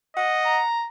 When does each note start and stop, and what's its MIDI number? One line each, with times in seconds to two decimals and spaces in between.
0.17 0.61 75
0.17 0.64 78
0.45 0.86 82